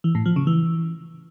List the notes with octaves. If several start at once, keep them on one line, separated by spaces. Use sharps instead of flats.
E3
A2
F3
C#3
E3